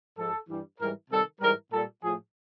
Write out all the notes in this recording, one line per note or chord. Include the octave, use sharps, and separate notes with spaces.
G#2 F3 A4
G2 E3 G3
G#2 E3 G3 A#4
C3 D#3 G3 A4
G#2 E3 G3 A#4
A#2 G3 A4
A2 F3 G#4